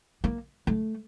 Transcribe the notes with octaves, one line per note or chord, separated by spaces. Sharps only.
A#3
A3